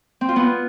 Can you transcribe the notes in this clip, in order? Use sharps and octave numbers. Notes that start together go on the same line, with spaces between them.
C4
F4
B3